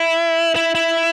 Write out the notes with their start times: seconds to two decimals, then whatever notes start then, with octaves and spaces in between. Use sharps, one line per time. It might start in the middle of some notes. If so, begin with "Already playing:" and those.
Already playing: E4
0.56 E4
0.75 E4